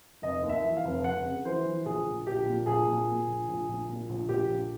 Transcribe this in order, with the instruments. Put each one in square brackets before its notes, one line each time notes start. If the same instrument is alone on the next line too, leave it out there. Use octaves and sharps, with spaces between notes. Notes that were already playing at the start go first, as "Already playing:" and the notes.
[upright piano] F1 D#5
D#2
E5
E3
F5
F1
F1 F#5
C#3
E3 C5
E3
A#1 G#4
A#1
A#1 G4
A#2
A#1 G#4
A#2
A#2
A#1
A#1
A#1
A#2
A#1
A#1 G4
A#1